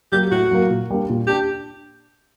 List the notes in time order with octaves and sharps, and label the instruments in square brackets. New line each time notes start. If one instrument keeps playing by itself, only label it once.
[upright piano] F#3 A#3 [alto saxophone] G4
[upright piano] A2 [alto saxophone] F#4
[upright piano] F#3 A#3
A#2
G3 A#3 D4
A#2
[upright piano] D4 [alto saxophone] G4